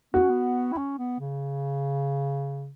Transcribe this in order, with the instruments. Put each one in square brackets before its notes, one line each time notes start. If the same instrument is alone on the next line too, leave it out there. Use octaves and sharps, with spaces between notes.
[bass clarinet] B3 [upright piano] F#4
[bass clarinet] C#4
B3
E4
C#4
B3
C#3